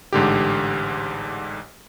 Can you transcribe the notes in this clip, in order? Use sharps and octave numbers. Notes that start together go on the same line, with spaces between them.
A1 G#2 D3 G4